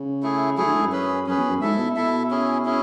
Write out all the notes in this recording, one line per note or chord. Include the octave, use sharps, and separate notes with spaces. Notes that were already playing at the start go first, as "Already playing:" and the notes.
Already playing: C#3
A3 E4 G#4
F#3 A3 E4 G#4
D3
G#2
F#2
C#4 G#4 B4
F#2 C#4 G#4 B4
E2
F#2
G#2 E4 A4 E5
B2
B2 E4 A4 E5
C#4 E4 G#4
C#4 E4 G#4